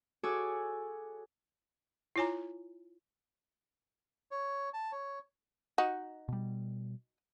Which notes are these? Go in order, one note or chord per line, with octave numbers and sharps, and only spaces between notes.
F#4 G#4 A4 C#5 D6 E6
E4 F4 C#5 G#5 A#5
C#5
A5
C#5
D#4 F#4
B2 G3